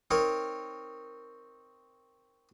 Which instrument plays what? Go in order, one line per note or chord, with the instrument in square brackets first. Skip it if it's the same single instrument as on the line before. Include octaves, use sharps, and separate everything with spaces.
[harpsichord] C4 D#4 A#4 C#5